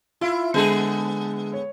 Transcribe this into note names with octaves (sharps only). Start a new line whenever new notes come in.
E4 F4
D3 G#3 B3 G#4 A4
C#5